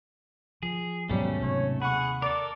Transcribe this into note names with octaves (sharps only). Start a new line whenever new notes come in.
F3 G#4
D#2 G#2 B2 F#3 G3 A3 C#4
D#2 C3 D#3 C#5
G#4 F#5 B5 C#6
A4 A#4 D5 D6